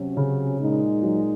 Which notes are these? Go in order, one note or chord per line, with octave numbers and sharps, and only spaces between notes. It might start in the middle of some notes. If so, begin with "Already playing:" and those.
Already playing: C3 F#3 C#4
C#3
A#2 G#3 D#4
F#3